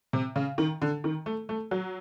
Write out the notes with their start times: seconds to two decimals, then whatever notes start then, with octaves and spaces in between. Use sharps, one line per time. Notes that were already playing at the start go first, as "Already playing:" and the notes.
0.13 C3
0.36 C#3
0.58 D#3
0.82 D3
1.04 D#3
1.26 A3
1.49 A3
1.71 F#3